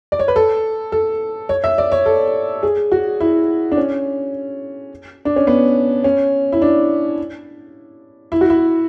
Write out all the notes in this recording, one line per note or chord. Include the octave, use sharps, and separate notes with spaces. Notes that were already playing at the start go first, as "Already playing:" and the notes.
D5
C#5
B4
A4
A4
C#5
E5
D5
C#5
A4
G#4
F#4
E4
D4
C#4
D4
C#4
B3
C#4
E4
D4
E4
F#4
E4